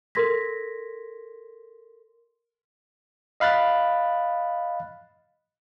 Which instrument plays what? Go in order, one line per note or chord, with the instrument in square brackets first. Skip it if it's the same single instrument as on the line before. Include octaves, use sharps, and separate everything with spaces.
[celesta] A4 A#4 C6 G#6 A#6 B6
[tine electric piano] D#5 F5 B5 F#6 A6